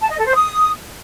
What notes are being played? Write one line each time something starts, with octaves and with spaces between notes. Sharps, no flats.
A5
D#5
A4
C5
D#6